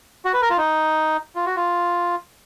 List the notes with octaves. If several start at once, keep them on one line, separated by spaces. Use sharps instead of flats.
F#4
B4
A#4
F4
D#4
F4
F#4
F4